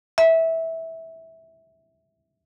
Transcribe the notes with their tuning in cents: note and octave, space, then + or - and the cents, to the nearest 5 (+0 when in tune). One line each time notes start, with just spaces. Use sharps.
E5 -15